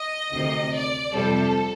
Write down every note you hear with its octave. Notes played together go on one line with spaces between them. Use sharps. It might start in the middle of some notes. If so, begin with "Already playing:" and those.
Already playing: D#5
D2 C3 D#3
D5
F2 C3 G3 A4